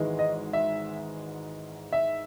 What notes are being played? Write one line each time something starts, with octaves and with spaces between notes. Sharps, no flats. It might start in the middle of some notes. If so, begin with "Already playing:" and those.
Already playing: G#1 G#2 E3 G#3
D#5
E5
E5